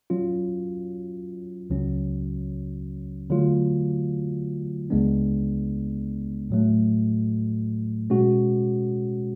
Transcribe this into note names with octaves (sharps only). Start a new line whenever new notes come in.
F#3 C#4 F4
C#2 C#3 F#3 C#4
D3 F#3 A3 F4
C#2 C#3 G#3 B3 D4
A2 F#3 A3
B2 G#3 C#4 F#4